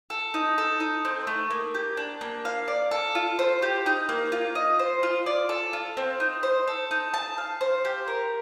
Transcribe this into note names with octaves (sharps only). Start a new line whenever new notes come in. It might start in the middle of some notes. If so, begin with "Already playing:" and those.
A4
D#4
A4
D#4
C4
A3
A#3
G4
D4
A#3
F5
D5
A4
F4
C5
G4
D#4
A#3
F4
D#5
C5
F4
D5
A4
F4
C4
D#4
C5
A4
D#4
A5
F5
C5
G4
A#4